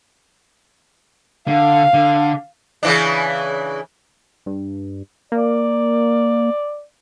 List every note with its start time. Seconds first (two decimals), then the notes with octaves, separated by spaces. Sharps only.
1.48 D3 F5
1.94 D3
2.83 C#3 E3 D4
4.46 G2
5.32 A#3 D5